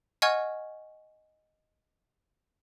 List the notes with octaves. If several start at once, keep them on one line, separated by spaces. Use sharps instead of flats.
D#5 F#5 G#5 C#6 F6 G#6